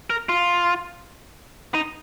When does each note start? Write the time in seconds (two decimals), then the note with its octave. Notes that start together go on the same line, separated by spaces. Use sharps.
0.10 A#4
0.29 F4
1.74 D#4